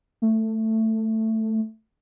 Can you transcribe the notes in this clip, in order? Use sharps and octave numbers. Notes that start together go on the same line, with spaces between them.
A3